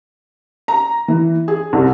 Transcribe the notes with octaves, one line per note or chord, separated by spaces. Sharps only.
A#5
E3
G#4
C2